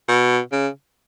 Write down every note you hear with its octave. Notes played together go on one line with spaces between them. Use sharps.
B2
C#3